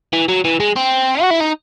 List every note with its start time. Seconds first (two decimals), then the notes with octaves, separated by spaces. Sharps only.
0.13 E3
0.28 F#3
0.45 E3
0.60 G#3
0.76 C4
1.22 F#4
1.31 E4
1.40 D#4